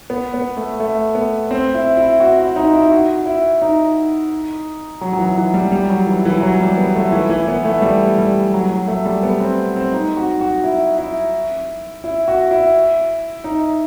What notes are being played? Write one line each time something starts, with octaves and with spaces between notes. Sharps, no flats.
B3
B3
A3
A3
B3
C4
E4
E4
F#4
E4
D#4
E4
F#4
E4
D#4
F#3
F#3
E3
E3
G3
G3
F#3
E3
E3
F#3
G3
B3
A3
E3
E3
B3
A3
G3
G3
F#3
F#3
A3
G3
B3
C4
C4
D#4
F#4
F#4
E4
E4
E4
F#4
E4
D#4